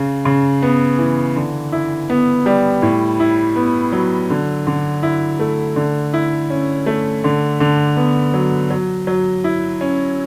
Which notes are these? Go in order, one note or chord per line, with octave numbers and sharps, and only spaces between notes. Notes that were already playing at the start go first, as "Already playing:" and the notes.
Already playing: C#3
C#3
B3
E3
D3
E4
B3
G3
A2
E4
B3
F#3
D3
D3
E4
A3
D3
E4
C#4
A3
D3
D3
B3
F#3
F#3
F#3
E4
C#4